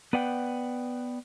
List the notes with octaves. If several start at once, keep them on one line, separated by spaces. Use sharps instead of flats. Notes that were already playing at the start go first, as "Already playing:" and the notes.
B3 B4 D5 F#5 G5